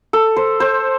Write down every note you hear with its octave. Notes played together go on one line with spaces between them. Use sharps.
A4
C5
C5